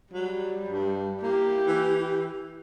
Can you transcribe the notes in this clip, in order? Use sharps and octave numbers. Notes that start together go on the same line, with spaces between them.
F#3 G3
G2
A#3 E4 G4
E3